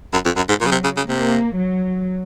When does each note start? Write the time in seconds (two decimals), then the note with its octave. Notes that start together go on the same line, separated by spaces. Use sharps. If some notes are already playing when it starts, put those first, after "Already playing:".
0.13 F#2
0.25 F2
0.36 F#2
0.49 G#2
0.61 A#2 F#3
0.66 C#3
0.72 C3
0.84 C#3
0.97 C#3
1.08 C3 A#3
1.55 F#3